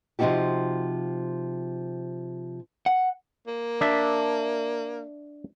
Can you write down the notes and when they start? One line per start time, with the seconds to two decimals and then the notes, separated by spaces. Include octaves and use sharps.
0.19 C3 F3 C4 D#4 F#4 G4
2.86 F#5
3.47 A#3
3.81 D4 E5